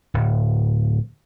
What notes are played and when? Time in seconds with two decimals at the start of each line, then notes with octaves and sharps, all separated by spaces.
0.14 D1